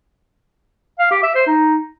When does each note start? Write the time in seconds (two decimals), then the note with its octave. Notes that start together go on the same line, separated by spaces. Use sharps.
0.99 F5
1.11 G4
1.23 E5
1.35 C5
1.47 D#4